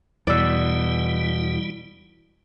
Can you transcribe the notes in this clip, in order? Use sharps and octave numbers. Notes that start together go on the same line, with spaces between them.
E2 B2 G3 E4 D5 E6